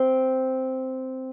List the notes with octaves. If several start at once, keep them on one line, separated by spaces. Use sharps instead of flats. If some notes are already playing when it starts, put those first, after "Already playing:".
Already playing: C4